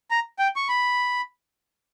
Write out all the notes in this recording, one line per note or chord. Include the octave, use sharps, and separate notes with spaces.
A#5
G5
C#6
B5